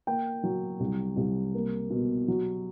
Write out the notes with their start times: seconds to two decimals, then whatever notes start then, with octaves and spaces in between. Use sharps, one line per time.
0.07 A#3 G5
0.43 F#3
0.80 C2
1.17 C2
1.55 A#3
1.90 B2
2.28 F#3